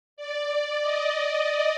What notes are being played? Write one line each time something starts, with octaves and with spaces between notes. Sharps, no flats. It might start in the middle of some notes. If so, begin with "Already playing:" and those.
D5
D#5